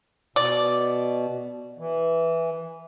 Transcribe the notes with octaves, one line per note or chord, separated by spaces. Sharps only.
B2 D5
E3